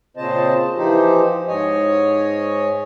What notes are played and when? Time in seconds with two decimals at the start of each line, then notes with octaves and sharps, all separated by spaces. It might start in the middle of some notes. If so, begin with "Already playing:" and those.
0.17 A#2 C#3 C4 C5 D#5 A5
0.77 E3 F3 D#4 G4 C5
1.48 G#2 C#5 D#5 G#5